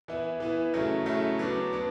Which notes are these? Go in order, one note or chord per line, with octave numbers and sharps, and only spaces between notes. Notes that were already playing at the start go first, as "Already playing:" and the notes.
E3 B3 E4
E3 B3 E4
C#3 F#3 A3 E4
C#3 F#3 A3 E4
F#3 B3 D4
F#3 B3 D4